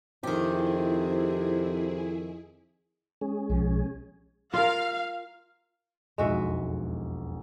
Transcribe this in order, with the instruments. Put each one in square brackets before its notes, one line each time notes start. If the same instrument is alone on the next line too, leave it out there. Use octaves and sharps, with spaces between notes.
[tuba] F2 [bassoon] C3 [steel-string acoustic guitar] D#3 G4 [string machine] E4 G#4
[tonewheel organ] G#3 C#4 G#4
[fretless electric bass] B1 F3
[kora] F4 A#4 [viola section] F5
[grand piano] E1 B1 F2 [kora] G#3 F#4 E5